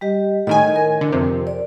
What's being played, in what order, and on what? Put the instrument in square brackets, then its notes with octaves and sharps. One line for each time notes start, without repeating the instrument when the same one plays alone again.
[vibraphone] G3 G4 D#5
[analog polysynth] A2 D#3 G#5 [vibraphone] D#5
[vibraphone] A#4
[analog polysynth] D3
F2 C3
[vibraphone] D5